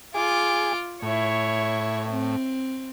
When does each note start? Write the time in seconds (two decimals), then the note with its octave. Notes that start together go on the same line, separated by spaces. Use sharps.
0.14 F4 G#4 D6
1.02 A2 E4 C#5
2.09 C4